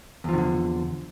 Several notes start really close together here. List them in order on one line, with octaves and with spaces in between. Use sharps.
E2 F3 D#3 D3